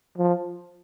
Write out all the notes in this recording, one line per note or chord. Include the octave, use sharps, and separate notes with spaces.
F3